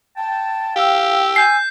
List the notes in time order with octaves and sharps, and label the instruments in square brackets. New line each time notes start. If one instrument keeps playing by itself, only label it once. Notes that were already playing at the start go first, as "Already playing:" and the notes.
[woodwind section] G5 A5
[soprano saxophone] G4 [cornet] F5 [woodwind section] G5 E6
[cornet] G#5 [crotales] G6 C7